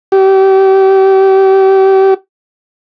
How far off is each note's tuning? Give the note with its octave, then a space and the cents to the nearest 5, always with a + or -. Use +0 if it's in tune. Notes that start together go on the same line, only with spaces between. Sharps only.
G4 -30